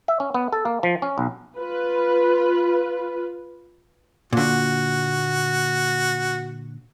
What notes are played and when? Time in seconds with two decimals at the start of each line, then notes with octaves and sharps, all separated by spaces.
0.08 E5
0.20 C#4
0.34 B3
0.53 A4
0.65 A#3
0.83 F3
1.02 C#4
1.18 B1
1.58 F4 B4
4.33 A#2 D3 F#4